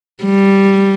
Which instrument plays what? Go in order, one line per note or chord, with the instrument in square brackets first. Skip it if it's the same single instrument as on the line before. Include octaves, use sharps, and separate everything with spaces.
[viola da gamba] G3